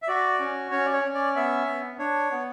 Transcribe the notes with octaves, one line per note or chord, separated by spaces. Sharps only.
E5
F#4 D5
C#4
C#4 C#5
D5
C#5
C#4
D5
B3 E5
B3
D4 C#5
B3